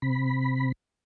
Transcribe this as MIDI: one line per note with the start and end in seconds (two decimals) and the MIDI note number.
0.02 0.72 48
0.02 0.72 83